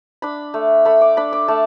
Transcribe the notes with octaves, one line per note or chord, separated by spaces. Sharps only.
D4 B5
A3
A3 B5
D6
D4 B5
D6
A3 A5